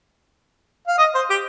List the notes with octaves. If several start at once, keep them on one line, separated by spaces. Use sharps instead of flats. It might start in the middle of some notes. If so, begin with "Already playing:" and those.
F5
D#5
C5
G4